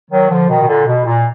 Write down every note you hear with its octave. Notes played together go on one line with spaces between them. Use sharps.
D#3 F#3
D3 F3
B2 D#3
B2
A#2 D3
B2
A#2